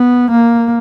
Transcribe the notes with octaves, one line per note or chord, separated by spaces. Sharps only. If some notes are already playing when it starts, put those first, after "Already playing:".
Already playing: B3
A#3